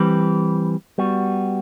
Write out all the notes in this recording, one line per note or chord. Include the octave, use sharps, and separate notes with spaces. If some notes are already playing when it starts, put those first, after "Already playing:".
Already playing: E3 G3 C4 G4 B4
G3 B3 F#4